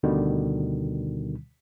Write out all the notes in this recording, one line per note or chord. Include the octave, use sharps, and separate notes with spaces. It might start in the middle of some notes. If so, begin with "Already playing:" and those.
D2 B2 D3 D#3 G3